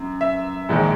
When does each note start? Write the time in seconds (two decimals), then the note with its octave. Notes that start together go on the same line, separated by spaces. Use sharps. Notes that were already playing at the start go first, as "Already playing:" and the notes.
Already playing: F#2
0.21 E5
0.69 A#1 G#2 D#3 G#3